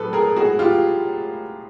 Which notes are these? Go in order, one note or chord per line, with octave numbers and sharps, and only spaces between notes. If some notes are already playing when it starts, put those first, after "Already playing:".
Already playing: A2 F#3 A3 A4 B4
G#4 A#4
F#4 G#4
F4 G4